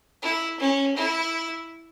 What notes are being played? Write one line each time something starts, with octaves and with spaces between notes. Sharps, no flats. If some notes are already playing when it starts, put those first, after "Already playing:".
E4
C#4
E4